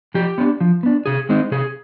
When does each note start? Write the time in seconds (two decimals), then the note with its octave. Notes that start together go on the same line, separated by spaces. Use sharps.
0.14 F3 G4
0.38 B3 D4
0.61 F3
0.83 B3 D4
1.06 C3 G#4
1.29 D#3 G#3 C4 D#4
1.51 C3 G#4